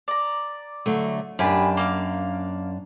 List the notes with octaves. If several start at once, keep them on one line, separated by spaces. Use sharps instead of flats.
D5 A#5
D3 F#3 A3
F#2 D4 G4 G#5 B5
A#3 F5